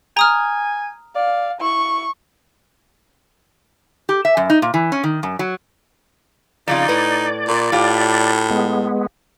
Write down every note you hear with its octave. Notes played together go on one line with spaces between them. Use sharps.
G#5 A#5 D#6 F6
D5 F5
E4 C#6
G4
E5
F#2
D#4
A#2
E3
C#4
D#3
F#2
F#3
F2 C#3 D#4 F4 D5
A2 B4
A#2
A2 F4 G4
G#3 B3